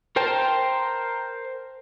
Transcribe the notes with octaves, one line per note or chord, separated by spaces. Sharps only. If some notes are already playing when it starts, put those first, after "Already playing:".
A#4 C5 G5 A5